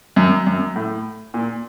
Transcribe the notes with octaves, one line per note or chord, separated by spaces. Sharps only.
F#2
F#2
A2
A#2